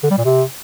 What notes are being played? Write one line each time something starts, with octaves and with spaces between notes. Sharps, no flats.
D3
G3
A#2
C3